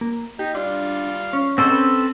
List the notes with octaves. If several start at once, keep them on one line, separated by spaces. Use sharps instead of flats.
A#3
D#4 G4
G3 D4 F4 F5
C#4
G#3 A3 C4 A4 C5 F#5
B4